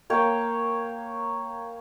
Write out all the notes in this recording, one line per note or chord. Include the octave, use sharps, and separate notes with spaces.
A#3 C#5 G5